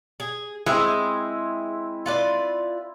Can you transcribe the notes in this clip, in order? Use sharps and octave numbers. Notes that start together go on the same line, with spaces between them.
G#4
G#3 C4 E4 G#4
F4 B4 D5